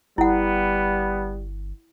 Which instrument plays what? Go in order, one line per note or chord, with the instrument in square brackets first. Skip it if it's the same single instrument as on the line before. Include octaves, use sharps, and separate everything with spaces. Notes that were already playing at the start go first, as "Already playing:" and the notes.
[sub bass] G1 [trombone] G3 [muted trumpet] B3 [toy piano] E4 F#5